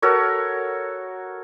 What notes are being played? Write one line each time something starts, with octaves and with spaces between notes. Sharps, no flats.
F#4 A4 A#4 C#5